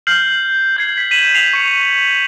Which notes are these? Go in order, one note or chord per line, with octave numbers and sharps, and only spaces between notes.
F6 G6 C7 F#7
G6 G#6 C7
B6
B6 D#7 E7 F#7
C7 F7
C#6 C#7 D#7